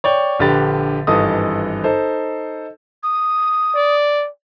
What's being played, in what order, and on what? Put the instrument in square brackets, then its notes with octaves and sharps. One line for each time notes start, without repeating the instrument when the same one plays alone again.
[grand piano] C#5 D5 G5
A#1 D3 G4 B4 A6
G#1 G2 E3 A4 D#5 D#6
D#4 A4 C5
[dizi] D#6
[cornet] D5